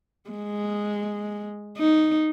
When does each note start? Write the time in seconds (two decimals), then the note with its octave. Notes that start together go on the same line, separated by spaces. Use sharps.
0.30 G#3
1.78 D#4